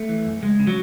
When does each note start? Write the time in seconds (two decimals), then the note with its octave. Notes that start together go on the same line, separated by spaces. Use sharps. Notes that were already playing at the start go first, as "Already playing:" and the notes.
Already playing: A3
0.09 E3
0.26 F#2
0.42 C#2 G#3
0.59 C#3
0.67 F#3